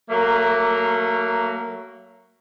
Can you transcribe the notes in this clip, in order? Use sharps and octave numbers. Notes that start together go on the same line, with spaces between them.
F#3 A3 A#3